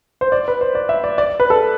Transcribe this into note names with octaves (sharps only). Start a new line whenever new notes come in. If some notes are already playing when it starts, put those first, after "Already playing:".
C5
D5
B4
C5
D5
E5
D5
D5
B4
A4